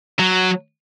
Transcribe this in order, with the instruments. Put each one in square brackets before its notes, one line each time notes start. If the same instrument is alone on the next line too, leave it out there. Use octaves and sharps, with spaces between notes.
[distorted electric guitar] F#3